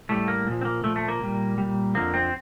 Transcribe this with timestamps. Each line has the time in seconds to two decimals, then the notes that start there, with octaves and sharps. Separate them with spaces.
0.09 A2 G3 A3
0.28 A#3
0.47 A#2 F3
0.61 C4
0.65 A#3
0.84 A#2 F3 A3
0.96 A3
1.08 A#3
1.21 A#2 G3
1.58 A#2 G3
1.95 F2 D3 F3 A#3
2.14 C4